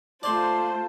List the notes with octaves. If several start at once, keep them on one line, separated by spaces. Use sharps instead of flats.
A3 F4 C5 D5 A5 C6